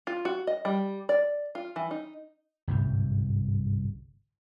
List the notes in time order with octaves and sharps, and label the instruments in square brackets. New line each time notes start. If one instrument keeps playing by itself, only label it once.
[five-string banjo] F4
F#4
D#5
G3
D5
F4
E3
D#4
[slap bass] G1 C2 G#2